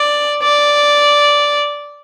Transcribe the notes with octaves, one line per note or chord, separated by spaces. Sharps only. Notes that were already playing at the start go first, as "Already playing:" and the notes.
Already playing: D5
D5